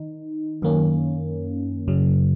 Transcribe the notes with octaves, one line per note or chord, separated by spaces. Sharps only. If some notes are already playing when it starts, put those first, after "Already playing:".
Already playing: D#3 D#4
F#2 D#3 A#3 C#4
F#2 C#3 F#3